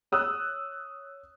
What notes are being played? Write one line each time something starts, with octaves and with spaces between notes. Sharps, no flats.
C#5 D#6 E6 F#6